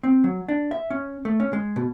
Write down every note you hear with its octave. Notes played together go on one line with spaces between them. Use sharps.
C4
F#3
D4
E5
C#4
A3
C#4
G#3
B2